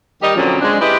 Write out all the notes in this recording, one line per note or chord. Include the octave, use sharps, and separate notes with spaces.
D#3 G3 D#4 G4
A#2 D3 F3 F#3 C4 C#4
G#3 D4
E4 G4 B4 C5 D#5